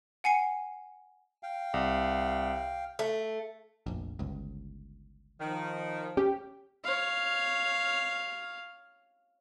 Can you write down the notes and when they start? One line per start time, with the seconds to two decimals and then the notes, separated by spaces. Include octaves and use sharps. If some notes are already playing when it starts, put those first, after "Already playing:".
0.24 F#5 G#5 C7 C#7
1.43 F5 G5
1.74 C2
2.99 A3
3.86 F1 A#1
4.19 G1 C#2
5.40 D#3 F3
6.17 C#4 G4
6.84 C#5 F5